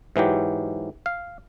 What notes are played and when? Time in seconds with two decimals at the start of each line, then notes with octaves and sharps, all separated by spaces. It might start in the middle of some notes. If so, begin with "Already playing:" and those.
0.16 G#2 E3 F#3 G4
1.06 F5